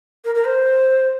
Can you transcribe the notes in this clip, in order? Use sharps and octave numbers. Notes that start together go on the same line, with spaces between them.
A#4
A#4
C5